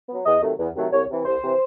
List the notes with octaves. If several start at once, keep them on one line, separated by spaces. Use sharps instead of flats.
F#3 B3
E2 D#5
C3 D#3 F#3 A3
E2
C3 D#3 F#3 A3
C2 C#5
C3 E3
C2 C5
C3 E3